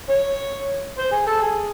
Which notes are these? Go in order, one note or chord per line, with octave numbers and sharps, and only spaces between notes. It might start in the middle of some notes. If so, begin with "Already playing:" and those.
C#5
C5
G#4
A4
G#4